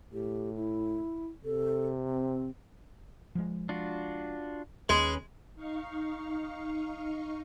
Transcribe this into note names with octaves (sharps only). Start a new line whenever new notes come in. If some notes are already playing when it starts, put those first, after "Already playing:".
A2 G4
E4
C3 A4
C4
F3 G#3
D4 F4 F#4
D#2 G#3 C#4 B4
D#4 F5 C#6